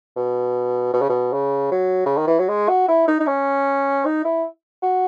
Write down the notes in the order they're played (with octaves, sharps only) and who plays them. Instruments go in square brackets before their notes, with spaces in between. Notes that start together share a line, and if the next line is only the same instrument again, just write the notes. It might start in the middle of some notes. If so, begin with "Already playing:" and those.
[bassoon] B2
B2
C#3
B2
C#3
F#3
C#3
D#3
E3
F#3
G#3
F#4
E4
D#4
D#4
C#4
D#4
E4
F#4